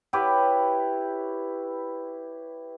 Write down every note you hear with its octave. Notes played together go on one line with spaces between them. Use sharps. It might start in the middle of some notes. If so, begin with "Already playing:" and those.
E4 G4 B4 C#5